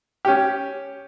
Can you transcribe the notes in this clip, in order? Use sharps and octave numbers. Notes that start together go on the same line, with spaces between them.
C#4 G4